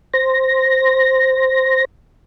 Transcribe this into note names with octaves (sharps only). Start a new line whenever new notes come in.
C5 A#6